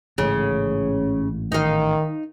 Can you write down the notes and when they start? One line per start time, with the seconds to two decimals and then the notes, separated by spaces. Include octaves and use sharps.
0.18 A1 G#2 C#3
1.52 D#3 D#4 F5